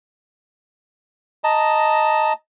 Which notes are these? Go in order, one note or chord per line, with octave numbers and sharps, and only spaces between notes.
D#5 A5 A#5